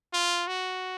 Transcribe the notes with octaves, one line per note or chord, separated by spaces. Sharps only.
F4
F#4